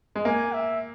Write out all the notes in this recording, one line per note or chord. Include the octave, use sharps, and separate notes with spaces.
G#3
A#3 G#5
E5